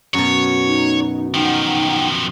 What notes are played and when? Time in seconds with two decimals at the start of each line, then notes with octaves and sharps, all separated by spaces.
0.14 F#2 B2 C#5
0.66 D#4
1.34 D#3 F3 D#4 F#5 G5